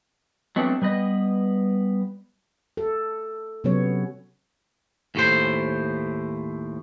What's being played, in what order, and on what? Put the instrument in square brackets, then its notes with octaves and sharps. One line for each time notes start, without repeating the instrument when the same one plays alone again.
[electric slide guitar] F#3 G#3 A3 B3 C4 D4
G3 B3 B4 D#5
[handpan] A4
C3 F#3 B3 C#4 C#5
[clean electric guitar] D#2 A2 C5